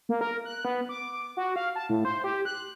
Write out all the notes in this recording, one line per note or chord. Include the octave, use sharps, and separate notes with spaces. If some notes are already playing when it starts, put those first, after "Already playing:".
A#3
A#4
F#6
B3
D6
F#4
F5
A5
A2
C5
G4
F#6